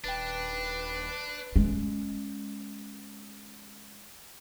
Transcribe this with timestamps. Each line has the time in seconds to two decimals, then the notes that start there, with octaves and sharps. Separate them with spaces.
0.04 D#1 D4 B4 G5 A6
1.56 G#3 C#4